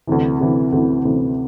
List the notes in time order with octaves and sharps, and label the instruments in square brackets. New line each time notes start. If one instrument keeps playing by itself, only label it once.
[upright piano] D2 C3 E3
D2 C3 E3
D2 C3 E3
D2 C3 E3